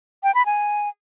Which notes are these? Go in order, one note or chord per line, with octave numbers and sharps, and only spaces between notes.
G5
B5
G#5